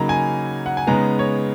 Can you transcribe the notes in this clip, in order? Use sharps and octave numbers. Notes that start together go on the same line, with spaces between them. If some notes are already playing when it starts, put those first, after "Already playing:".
Already playing: C#3 F#3 A#3 D#4 A#5 B5
G#5
F#5
G#5
C#3 G#3 B3 D#4 A#5
C#5